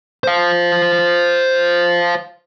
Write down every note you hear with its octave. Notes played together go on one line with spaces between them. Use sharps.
C5 F5